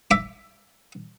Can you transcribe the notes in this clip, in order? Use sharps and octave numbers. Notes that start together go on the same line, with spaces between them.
E5 D6